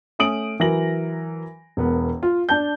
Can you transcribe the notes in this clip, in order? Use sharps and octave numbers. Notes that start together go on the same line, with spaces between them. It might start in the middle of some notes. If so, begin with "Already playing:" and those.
A3 C#4 D#6 D7 F#7
E3 F#3 A#4 A#6 F#7
E1 B3 A#4
F4
D4 A5 G6